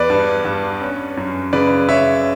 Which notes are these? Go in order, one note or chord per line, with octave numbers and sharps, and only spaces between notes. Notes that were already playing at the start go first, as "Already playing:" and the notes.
Already playing: E2 B4 D5
G2
G2
C#4
F#2
C#3 B4 D5
C#3 C#5 E5